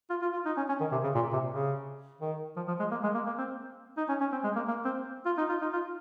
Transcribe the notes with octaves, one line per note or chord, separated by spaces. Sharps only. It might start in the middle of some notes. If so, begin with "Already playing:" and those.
F4
F4
F4
D#4
C#4
C#4
D#3
C3
C#3
A#2
C3
C#3
D#3
F3
F3
G#3
A#3
G#3
A#3
A#3
C4
D#4
C#4
C#4
C4
G#3
A#3
A#3
C4
F4
D#4
F4
D#4
F4